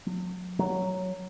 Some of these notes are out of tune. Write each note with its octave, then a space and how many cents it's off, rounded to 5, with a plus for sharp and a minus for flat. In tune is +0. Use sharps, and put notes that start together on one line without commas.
F#3 -35
F#3 +5